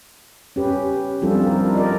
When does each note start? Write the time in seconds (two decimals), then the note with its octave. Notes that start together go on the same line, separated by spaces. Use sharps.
0.56 C#4 G4 B4
1.22 F3 G3 C4 D4 F4 A4
1.47 E4 A#4
1.75 A#4 D5 D#5